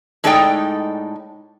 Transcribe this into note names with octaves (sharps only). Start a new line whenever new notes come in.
A2 G#3 D#4 A4 D5 G5